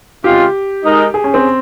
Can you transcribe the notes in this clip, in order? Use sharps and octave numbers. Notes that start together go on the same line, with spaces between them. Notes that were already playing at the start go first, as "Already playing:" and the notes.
C#3 G#3 C4 F4 G4
G#3 D#4 A#4
G#4
C#4
C4